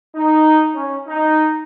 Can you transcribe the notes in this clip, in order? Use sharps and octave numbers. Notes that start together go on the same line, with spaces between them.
D#4
C#4
D#4